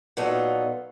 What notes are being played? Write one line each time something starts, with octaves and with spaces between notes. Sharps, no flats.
A#2 F#3 B3 D#4 F4 A4